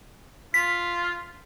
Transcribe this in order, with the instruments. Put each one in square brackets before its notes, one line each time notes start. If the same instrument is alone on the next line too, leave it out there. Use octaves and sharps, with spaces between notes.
[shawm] F4 [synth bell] B6